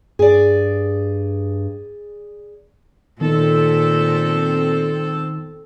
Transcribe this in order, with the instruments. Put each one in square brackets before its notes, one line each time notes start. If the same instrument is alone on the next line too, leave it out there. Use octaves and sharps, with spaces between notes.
[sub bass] G2 [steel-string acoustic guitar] G#4 D5
[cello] A#2 [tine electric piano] D#3 B3 D#4 [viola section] C4 A4